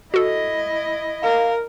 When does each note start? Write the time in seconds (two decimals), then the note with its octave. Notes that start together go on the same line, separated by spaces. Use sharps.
0.14 E4 F#4 A4 D#5
1.23 A#4 F5